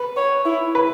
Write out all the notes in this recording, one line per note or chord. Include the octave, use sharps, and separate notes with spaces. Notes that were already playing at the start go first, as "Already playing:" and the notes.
Already playing: B4
C#5
E4
B4